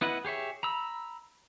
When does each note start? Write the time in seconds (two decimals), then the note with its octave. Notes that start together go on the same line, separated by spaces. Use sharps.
0.01 B3 E4 B4 D#5 F#5
0.25 G4 G#4 C#5 E5
0.63 A#5 B5 E6